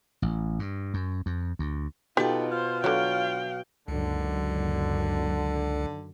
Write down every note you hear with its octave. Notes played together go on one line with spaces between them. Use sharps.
A1
G2
F#2
F2
D2
B2 D#4 F4 G4 A4 B4 D5 G5
F4 C5
D3 F#3 F#4 F5 G5
F#1 C#2 D3 D#3 F#3